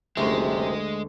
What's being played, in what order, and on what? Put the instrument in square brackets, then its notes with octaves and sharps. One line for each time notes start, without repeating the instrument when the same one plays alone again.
[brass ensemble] F#1 [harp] D2 [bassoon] C3 [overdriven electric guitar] G#3